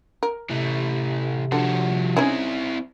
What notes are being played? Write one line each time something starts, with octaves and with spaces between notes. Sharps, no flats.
A#4
C3 E3 A3
D3 F3 F#4
C4 C#4 D#4 E4 G#4